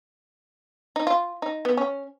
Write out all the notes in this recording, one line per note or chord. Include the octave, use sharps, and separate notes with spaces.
D#4
F4
D#4
B3
C#4